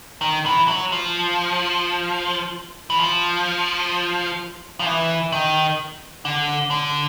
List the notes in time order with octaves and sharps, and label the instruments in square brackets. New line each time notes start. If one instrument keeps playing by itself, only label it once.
[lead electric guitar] D#3
E3
F#3
F3
E3
F3
F3
E3
D#3
D3
D3